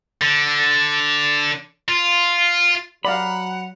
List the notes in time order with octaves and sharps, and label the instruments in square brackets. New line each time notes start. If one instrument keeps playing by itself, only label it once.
[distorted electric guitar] D3
F4
[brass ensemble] F#3 [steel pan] D5 F5 [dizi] F#5 [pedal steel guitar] A#5 B5